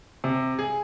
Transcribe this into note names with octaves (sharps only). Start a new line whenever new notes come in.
C3
G#4